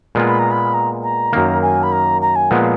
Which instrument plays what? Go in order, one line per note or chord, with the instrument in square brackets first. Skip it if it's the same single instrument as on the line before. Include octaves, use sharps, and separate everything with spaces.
[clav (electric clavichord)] A#2 G#3 B3 F4
[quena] B5
A#5
B5
A#5
A#5
[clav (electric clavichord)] F#2 D#3 A#3
[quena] G#5
B5
A#5
A#5
G#5
[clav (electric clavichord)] A#2 F3 G#3 B3 [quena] F#5
[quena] F5